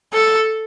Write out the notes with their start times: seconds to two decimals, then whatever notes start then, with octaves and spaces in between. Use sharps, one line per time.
0.14 A4